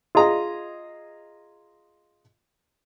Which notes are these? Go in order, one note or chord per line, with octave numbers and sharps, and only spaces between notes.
F4 G#4 D#5 A#5